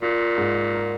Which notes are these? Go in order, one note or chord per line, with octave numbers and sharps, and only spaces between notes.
A#2 F4
G#2
A#4